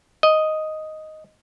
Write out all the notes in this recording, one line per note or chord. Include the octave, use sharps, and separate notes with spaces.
D#5